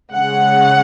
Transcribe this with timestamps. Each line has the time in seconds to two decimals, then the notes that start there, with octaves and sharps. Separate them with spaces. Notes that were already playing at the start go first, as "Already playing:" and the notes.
0.13 C#3 G#3 C#4 F#5